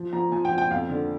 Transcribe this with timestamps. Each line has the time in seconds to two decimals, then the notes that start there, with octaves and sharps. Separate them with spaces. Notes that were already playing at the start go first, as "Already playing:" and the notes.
Already playing: F3
0.13 F3 A#5
0.32 F3 G#5
0.45 G5
0.51 F3
0.58 G5
0.71 F2 F5
0.90 D3